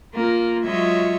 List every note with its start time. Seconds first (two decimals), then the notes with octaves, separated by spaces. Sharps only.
0.14 A#3 F4 A#4
0.64 F#3 G#3 F4 C#5 D#5 E5